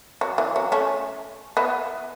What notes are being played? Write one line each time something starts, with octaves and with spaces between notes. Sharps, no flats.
F#3
E3
F#3
A3 C#4
B3 E4